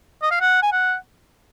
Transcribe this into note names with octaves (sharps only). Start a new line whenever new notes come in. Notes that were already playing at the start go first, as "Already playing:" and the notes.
D#5
F5
F#5
G#5
F#5